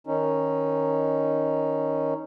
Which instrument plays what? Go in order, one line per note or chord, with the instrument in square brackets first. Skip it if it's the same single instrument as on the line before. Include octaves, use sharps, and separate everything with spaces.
[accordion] D#3 C#4 D#4